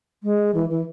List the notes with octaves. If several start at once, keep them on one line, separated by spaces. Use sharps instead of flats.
G#3
E3
E3